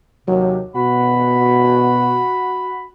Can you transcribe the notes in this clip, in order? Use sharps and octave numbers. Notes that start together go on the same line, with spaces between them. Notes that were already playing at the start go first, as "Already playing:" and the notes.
D#2 C3 F#3
B2 F#4 B5